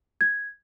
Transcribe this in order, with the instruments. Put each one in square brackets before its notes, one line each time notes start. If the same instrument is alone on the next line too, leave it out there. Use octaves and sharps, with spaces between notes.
[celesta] G#6